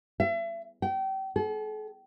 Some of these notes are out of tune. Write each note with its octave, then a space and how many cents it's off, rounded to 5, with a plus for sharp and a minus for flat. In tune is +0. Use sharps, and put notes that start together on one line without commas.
E5 +35
G5 -30
A4 -45